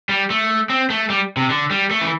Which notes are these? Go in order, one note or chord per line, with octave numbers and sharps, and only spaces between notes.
G3
A3
C4
A3
G3
C3
D3
G3
A3
E3